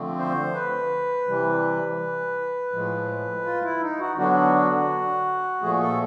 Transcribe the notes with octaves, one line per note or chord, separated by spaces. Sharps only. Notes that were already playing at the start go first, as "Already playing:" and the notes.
Already playing: D3 F3 A3 C4
C5
B4
C3 E3 G3
A2 F3 G#3
F4
E4
D#4
F#4
D3 F#3 B3 D4 F#4
A#2 F3 A3 G#4
A4